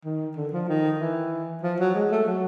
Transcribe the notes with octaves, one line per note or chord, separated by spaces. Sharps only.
D#3
D3
F3
D#3
E3
F3
F#3
G#3
A3
F#3